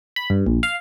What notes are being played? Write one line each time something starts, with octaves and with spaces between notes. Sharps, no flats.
B5
G2
A#1
F5